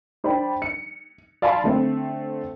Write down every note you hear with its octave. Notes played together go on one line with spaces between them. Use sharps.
D4 C5 D5 G5 B5
C#7
D5 F5 G#5 A5 B5 C6
D3 A3 C4